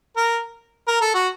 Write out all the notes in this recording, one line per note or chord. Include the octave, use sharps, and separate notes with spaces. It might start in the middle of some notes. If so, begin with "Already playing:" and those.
A#4
A#4
A4
F#4